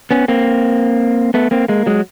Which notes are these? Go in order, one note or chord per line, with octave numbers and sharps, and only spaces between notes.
B3 C#4
A#3 C4
A3 B3
A#3 C4
G#3 A#3
F#3 G#3